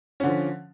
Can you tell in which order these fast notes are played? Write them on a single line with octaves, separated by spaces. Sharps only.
C#4 D3 F3